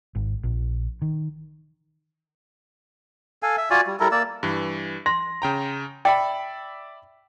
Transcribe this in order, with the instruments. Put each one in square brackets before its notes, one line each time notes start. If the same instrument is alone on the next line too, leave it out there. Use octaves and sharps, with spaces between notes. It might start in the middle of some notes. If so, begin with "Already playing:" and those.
[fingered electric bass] G#1
A#1
D#3
[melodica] A4 F5 G#5
E5
F4 F#4 D5 G#5
G3
G3 E4 A4 A#4
A#3 D5 E6
[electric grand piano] G2 E3
[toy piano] C6 [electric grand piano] A#6
[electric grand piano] C#3 G5 A#5
[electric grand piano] D5 E5 B5 [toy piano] G5